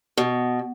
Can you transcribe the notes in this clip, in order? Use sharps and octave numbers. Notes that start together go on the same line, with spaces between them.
B2